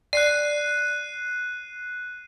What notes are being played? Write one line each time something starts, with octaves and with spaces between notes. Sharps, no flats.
D5 F#6 C7 D#7